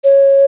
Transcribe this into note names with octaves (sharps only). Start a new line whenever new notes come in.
C#5